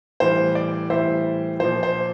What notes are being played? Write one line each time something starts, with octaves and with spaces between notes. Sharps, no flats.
A2 E3 G3 C5
D5
A2 E3 G3 C5 E5
A#2 F3 C5
C5